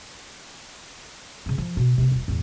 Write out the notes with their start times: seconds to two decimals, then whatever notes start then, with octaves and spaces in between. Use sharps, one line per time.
1.46 F#2 C#3
1.58 F3
1.77 B2
1.98 C3 A#3
2.12 D#1
2.28 E2 A2